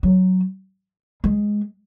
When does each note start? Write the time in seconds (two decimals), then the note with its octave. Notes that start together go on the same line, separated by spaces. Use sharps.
0.03 F#3
1.24 G#3